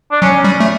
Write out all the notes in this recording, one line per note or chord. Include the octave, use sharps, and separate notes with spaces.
D4
F#3 C#4
G3
A3